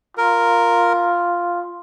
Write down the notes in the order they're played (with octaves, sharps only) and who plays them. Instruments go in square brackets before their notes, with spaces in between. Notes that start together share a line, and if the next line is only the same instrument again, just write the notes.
[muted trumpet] F4 [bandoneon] A#4